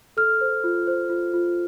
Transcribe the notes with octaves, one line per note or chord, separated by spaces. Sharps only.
A4 F6
C5
F4
C5
F4
F4